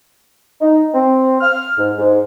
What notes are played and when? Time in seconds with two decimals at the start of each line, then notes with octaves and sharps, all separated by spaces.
0.61 D#4
0.94 C4
1.41 F6
1.78 G#2
1.99 G#2